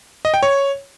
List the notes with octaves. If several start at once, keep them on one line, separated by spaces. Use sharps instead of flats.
D#5
G5
C#5